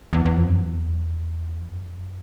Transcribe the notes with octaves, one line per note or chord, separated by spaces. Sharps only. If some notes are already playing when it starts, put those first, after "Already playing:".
E2
E2
F2
F#2
E2
F2
F#2
F2
F#2